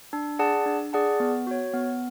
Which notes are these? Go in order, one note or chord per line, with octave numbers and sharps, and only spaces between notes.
D4
G#4 D5 F#5 A5
D4
G#4 D5 F#5 A5
B3
F#4 C#5
B3